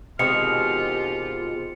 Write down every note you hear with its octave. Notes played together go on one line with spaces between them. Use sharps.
B2 D#3 G#3 C4 F4 G4 F6 C#7
F4